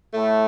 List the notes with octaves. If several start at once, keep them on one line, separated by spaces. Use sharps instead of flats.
A2 A3